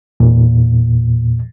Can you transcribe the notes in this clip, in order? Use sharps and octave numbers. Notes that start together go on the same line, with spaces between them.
E2 A#2